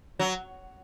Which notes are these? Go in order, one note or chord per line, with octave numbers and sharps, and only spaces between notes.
F#3